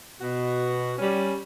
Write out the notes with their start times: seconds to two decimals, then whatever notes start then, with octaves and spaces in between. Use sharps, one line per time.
0.21 B2 F#4
0.98 G3 C#4